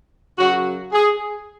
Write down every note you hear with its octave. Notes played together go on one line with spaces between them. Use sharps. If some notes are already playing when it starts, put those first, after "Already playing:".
F#2 C#3 F#3 F#4
G#4